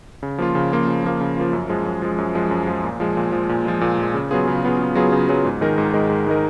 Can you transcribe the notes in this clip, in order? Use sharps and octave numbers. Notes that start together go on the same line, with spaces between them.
C#3
F3 A#3 F4
C#3
F3 A#3 F4
C#3
F3 A#3 F4
C#3
F3 A#3 F4
F#2
F3 G#3
F#2
F3 G#3
F#2
F3 G#3
F#2
F3 G#3
A#2
F3 G#3
A#2
F3 G#3
A#2
F3 G#3
A#2
F3 G#3
C#3
F#3 B3 F4 G#4
C#3
F#3 B3 F4 G#4
C#3
F#3 B3 F4 G#4
C#3
F#3 B3 F4 G#4
G#2
D#3 G#3 D#4 A#4
G#2
D#3 G#3 D#4 A#4
G#2
D#3 G#3 D#4 A#4